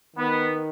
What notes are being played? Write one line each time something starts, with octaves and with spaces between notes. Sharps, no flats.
D#3 B3